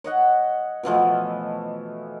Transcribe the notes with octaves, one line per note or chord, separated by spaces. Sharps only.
C#5 D#5 F#5
B2 E3 F3 A3